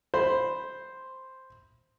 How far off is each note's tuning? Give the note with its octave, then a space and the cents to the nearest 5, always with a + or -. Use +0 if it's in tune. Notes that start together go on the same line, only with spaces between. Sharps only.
C5 +0 B5 +0